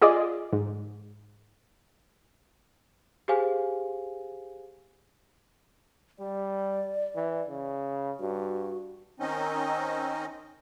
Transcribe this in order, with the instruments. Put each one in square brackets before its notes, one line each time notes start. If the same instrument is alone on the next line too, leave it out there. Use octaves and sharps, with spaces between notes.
[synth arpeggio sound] F4 G#4 D5 D#5
G#2
[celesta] G4 G#4 C5 F5 G#5
[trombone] G3 [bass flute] D5
[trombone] E3
C#3
[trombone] G2 [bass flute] F#4
[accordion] D#3 C4 C#4 D#4 D#5